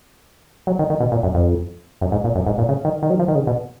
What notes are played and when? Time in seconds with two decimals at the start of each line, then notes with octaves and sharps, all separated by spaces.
0.67 F#3
0.79 D#3
0.90 D#3
1.00 B2
1.12 A#2
1.23 F#2
1.35 F2
2.01 F#2
2.12 G#2
2.24 A#2
2.35 F#2
2.46 G#2
2.58 A#2
2.69 C#3
2.85 D#3
3.03 D#3
3.10 F#3
3.19 F3
3.28 D#3
3.35 C#3
3.47 B2